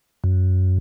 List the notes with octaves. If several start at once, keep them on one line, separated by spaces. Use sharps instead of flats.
F#2